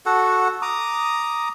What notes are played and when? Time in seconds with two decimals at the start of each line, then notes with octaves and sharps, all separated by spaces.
0.06 F#4 A4 F#5
0.62 A#5 D6 D#6